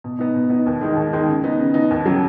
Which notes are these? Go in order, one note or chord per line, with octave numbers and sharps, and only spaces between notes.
B2
B3 D#4
B2
B3 D#4
D#2
D#3 G#3 D#4
D#2
D#3 G#3 D#4
C#3
B3 D#4
C#3
B3 D#4
D#2
C#3 F#3